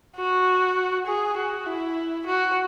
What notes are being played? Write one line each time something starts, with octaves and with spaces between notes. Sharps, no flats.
F#4
G#4
F#4
E4
F#4